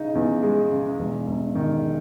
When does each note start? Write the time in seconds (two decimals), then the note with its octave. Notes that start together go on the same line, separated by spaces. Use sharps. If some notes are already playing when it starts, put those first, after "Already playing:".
Already playing: C#3 D#4
0.15 E2
0.43 G#3
0.71 C#3
0.99 E1
1.27 E1
1.55 D#3